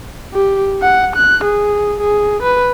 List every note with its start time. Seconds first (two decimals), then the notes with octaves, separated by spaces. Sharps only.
0.33 G4
0.82 F#5
1.16 F#6
1.45 G#4
2.01 G#4
2.43 B4